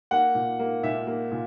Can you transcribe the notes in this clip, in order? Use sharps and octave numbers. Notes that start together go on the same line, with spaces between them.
A#3 F#5
A#2
A#3
A#2 E5
A#3
A#2